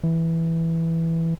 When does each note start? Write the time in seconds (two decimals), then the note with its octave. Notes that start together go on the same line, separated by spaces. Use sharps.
0.03 E3